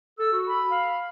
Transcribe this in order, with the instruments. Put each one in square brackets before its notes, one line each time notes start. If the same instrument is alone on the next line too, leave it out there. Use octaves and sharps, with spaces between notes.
[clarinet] A4 [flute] E6
[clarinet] F#4
[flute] B5
[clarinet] F5